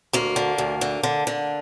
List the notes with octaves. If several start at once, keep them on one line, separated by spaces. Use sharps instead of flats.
D2 A#3
D3
D2
D3
D3
D3